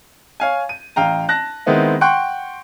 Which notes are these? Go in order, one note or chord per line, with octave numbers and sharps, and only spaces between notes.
C#5 F5 G#5
D#7
A1 F5 G5 A#5
A5 F#6 A#6
D#3 G#3 B3 C4 E4
F#5 G5 C6 C#6 F#6